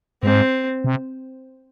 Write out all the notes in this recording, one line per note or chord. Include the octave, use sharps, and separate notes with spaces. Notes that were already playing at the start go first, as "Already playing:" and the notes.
G#2 C4
C3